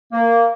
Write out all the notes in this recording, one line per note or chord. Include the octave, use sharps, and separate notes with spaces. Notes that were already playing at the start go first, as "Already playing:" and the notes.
A#3